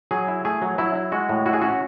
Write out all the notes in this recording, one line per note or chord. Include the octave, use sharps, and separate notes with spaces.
F#3 G#4
E4
A3 G#4
F#3
F#3 E4
E4
G#3 F#4
A2
E4 F#4
G#4
C#4 F#4